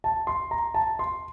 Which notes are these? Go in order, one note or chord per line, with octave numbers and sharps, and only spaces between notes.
A5
C6
A#5
A5
C6